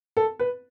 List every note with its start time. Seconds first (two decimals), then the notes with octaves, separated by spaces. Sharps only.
0.17 A4
0.39 B4